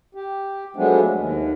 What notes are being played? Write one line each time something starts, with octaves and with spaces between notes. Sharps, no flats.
G4
F3 F#3 G#3 A3 B3 D4
D#2